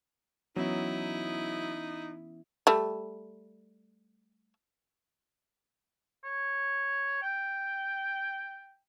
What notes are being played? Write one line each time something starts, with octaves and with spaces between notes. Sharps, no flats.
E3 F#3 B3 C#4 D#4 E4 D#6
G3 A3
C#5
G5